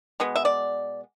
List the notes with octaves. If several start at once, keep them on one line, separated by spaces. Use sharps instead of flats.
B2 G#3 B3
E5
D5